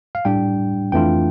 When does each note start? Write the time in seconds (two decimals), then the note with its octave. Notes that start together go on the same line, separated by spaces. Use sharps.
0.15 F5
0.25 A2 G3 D4 G5
0.92 F2 E3 A3 D4 F4 G5